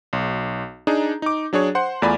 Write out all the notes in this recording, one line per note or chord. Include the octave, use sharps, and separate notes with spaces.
B1
D4 D#4 G#4 A#5
D#4 D6
F#3 D4 G#4 C#5
C5 F#5 C6
E2 A3 F4 D5 G#5 B5